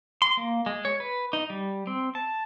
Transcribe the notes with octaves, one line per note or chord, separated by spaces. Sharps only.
C6
A#3
G#3
C#5
B4
D#4
G3
C4
A5